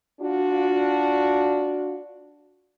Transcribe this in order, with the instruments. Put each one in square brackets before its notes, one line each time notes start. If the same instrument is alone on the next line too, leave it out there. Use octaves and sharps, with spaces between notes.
[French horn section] D4 F4 F#4